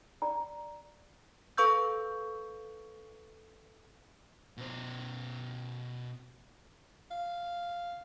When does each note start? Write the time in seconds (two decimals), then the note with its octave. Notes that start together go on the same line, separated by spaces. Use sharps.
0.22 D5 A#5
1.58 A4 B4 F5 C#6 E6 G6
4.57 B2 C5
7.11 F5